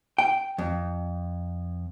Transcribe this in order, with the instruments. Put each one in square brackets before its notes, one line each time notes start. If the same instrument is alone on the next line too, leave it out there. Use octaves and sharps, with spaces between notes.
[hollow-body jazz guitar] G5
F2